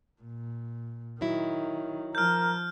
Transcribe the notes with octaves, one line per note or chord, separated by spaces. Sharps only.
A#2
D#3 F#3 E4
F3 A#4 F6 G6